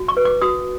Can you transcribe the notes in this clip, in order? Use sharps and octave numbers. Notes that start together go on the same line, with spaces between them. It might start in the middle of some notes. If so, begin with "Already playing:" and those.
Already playing: F#4
C#6
B4
D6
F#4 D#6